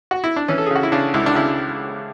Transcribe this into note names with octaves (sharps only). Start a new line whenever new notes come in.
F#4
E4
D4
E3 C#4
A4
G#4
C#3 F#4
E4
C#3 D4
C#2 E4
D4
C#3 E4